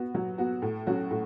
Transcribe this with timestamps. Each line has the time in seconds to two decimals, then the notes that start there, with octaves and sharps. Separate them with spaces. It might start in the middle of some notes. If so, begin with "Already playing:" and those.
Already playing: B3 F#4
0.15 F#3
0.38 B3 F#4
0.62 A2
0.87 F#3 C#4 F#4
1.11 A2